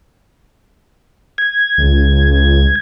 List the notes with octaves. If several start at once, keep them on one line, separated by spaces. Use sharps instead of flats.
G#6
C#2